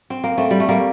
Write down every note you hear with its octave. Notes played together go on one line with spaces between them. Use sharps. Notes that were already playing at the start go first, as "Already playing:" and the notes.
C4
A#3
A3 C4
G3
A3
G3 A#3